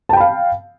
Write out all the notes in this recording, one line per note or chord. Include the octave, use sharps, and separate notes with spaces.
F5 G5 A5 B5